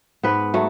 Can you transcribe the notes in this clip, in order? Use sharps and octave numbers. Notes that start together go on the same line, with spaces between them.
G#2 B3 B4
F#3 A3